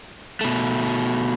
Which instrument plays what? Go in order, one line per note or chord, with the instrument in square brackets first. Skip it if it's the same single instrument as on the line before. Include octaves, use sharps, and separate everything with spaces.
[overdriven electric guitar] B2 A3